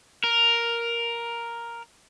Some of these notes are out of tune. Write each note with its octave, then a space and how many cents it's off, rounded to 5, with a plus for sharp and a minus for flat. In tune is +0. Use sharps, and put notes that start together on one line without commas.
A#4 +5